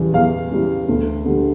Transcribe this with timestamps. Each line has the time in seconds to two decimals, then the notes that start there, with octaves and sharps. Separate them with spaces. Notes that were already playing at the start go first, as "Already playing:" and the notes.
Already playing: E2 C#3 E3 G3
0.14 E2 F5
0.51 C#3 E3 G3
0.89 D2
1.25 D3 G3